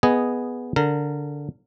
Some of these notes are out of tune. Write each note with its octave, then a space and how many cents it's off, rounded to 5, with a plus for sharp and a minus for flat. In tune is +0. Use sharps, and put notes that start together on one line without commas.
B3 +0 G#4 +0 D#5 +0
D3 -15 A#4 -20